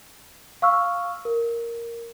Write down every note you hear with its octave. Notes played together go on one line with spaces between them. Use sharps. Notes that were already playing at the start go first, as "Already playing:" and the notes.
F5 C#6 E6 F6
A#4